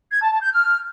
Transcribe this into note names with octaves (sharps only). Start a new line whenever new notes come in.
G#6
A5
A5
G6
F6